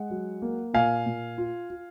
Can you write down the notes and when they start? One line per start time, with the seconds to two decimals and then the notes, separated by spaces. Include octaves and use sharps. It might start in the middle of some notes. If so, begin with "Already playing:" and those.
Already playing: G#3 F#5
0.10 F#3
0.42 A#3
0.74 A#2 F5 G#5
1.06 A#2
1.38 F4
1.70 F4